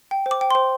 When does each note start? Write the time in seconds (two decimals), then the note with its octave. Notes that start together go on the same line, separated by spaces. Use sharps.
0.11 G5
0.26 C5
0.31 D6
0.41 G5
0.51 C5 C6